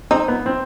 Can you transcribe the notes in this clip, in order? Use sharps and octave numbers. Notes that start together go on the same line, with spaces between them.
C4 D#4
B3
C4